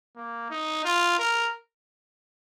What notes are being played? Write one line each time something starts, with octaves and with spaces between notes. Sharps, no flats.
A#3
D#4
F4
A#4